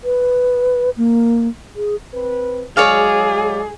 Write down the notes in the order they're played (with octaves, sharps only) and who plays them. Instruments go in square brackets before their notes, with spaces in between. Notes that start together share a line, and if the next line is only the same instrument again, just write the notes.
[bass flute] B4
A#3
G#4
[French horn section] C4 B4
[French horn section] F#3 G#3 [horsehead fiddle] G#4 [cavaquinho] C#5 D5 F5